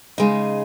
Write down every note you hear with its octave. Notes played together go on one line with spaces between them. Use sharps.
C#3 G#3 D#4